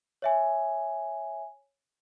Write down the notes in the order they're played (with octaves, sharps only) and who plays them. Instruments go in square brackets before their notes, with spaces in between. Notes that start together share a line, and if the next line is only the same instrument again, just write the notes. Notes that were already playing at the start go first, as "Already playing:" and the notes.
[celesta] C#5 E5 G#5